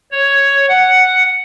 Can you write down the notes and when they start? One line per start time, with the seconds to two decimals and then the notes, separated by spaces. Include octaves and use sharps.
0.12 C#5
0.69 F#5